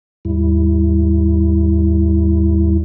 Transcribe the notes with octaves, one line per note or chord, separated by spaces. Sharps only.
D#2 G#2 G3 E4